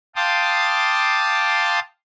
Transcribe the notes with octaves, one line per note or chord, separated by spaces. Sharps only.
F5 G5 A5 C6 D6 D#6